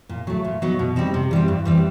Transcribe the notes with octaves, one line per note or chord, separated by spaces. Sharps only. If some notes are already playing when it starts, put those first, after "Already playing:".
A#2
F#3 A3
A#2
F#3 B3 D#4
B2
G3 C4 D#4
C3
E3 G3 C4
G2
E3 G3 C4